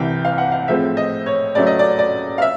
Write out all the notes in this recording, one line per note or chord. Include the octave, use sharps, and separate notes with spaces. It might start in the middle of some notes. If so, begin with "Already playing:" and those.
Already playing: C2 C3 E3 G5
F5
F#5
F5
A2 F3 G#3 C4 E5
D#5
C#5
C#2 C#3 F#3 A3 C#4 D5
D#5
D5
D5
F5
E5